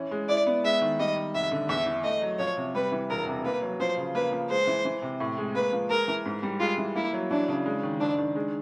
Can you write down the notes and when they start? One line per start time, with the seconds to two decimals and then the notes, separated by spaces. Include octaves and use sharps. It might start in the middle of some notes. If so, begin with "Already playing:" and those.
Already playing: E3 C#4
0.11 G#3
0.28 E4 D5
0.46 B3
0.64 G#3 E5
0.82 D#3
0.99 G3 D#5
1.16 D#3
1.34 F1 E5
1.52 D3
1.69 E2 E5
1.86 E3
2.04 A3 D#5
2.22 F#3
2.39 F3 C#5
2.57 C3
2.75 G3 B4
2.92 E3
3.10 E1 A#4
3.27 C3
3.44 A#3 B4
3.62 F#3
3.80 F3 C5
3.97 C#3
4.15 A#3 B4
4.32 F3
4.50 G#3 C5
4.67 E3
4.85 E3
5.02 C3
5.20 A2
5.38 G#3
5.55 A#3 B4
5.72 F3
5.90 G#3 A#4
6.08 E3
6.26 G#2
6.43 G3
6.60 G#3 F4
6.78 E3
6.95 A#3 E4
7.13 F#3
7.31 E3 D4
7.48 C#3
7.66 G#3
7.83 D#3
8.00 F#1 D4
8.18 D#3
8.36 G#3